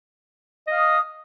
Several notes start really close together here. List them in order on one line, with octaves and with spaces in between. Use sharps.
D#5 F5 D#6